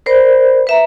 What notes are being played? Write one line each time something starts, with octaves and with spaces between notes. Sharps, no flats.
A#4 C5 D5 B5
B4 E5 A#5